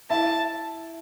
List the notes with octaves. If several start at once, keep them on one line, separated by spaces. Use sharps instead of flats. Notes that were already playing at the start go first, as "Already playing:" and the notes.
E4 A5